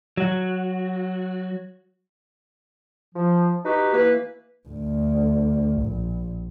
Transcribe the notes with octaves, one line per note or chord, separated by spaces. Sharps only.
F#3 F#4
F3
D#4 F#4 G4 B4
E3 A#3 B4
D2
A#1